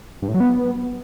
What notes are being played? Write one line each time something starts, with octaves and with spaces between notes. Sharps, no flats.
G2
A2
F#3
B3